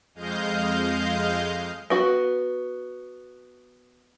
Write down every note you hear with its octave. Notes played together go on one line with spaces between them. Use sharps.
F2 G#3 D#5 F5 G6
B3 F#4 F#5